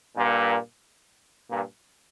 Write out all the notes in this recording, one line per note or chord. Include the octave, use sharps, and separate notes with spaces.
G2 A#2
G2 A#2